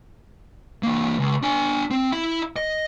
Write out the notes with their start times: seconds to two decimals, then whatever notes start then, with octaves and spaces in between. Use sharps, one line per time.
0.83 E3 A#3
1.19 C#2
1.42 D4 G#5
1.91 C4
2.12 E4 E5
2.56 D#5